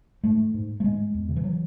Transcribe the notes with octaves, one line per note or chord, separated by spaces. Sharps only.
G#2 A3
G#2
A3
G#2 G#3
E2
C#3
E3
F#3